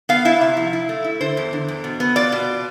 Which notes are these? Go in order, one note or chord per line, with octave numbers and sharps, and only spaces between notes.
B3 F5
E4 E5
C3
F3
E4
A3
E4
D3 C5
E2
D3
E2
B2
B3
F4 D5
B2